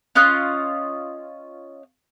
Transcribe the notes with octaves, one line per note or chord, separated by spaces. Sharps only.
C#4 F4 D#5 F#6